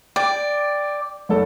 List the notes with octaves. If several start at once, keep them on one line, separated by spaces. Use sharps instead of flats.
D5 G5
F#1 A4